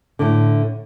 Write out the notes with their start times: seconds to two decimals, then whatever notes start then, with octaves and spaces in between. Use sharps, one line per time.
0.19 A2 D3